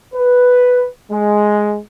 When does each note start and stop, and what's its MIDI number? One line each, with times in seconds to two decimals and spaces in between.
0.14 0.87 71
1.11 1.79 56